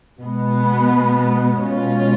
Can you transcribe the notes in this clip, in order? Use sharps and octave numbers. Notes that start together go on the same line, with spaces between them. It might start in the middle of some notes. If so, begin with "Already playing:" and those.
B2 G#3 B3
B2 G#3 C#4 F4